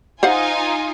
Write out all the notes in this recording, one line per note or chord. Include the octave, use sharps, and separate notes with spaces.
D#4 F4 C5 F5 F#5 G#5